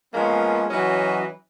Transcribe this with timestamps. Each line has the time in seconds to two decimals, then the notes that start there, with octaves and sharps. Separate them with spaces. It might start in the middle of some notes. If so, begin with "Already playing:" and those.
0.14 F3 G#3 A#3 B3 C#4
0.70 E3 F#3 C#4 F#4 D#5